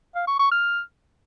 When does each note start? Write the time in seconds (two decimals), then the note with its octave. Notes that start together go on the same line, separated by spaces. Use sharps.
0.15 F5
0.27 C#6
0.39 C#6
0.51 F6